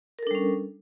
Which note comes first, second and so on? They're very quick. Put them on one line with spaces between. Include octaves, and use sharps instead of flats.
A#4 A4 D4 G3 C#4